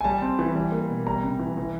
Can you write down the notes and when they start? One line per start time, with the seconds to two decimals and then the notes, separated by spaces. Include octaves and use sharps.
0.01 G#5
0.04 G3 A5
0.22 C4
0.39 E3
0.55 G3
0.72 A#3
0.89 B2
1.07 G3 A#5
1.23 C3
1.39 E3
1.57 E3